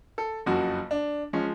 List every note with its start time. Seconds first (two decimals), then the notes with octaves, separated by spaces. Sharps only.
0.18 A4
0.46 F#1 F2 C#3 F#3 F#4
0.91 D4
1.33 F3 G#3 C#4